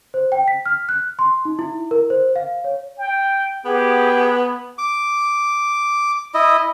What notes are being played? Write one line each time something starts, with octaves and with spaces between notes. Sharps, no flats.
C5
G5
B6
F6
F#6
C6
D#4
E4
A#4
C5
F5
C#5
G5
B3 G4 G#4 F#5
D6
E4 D#5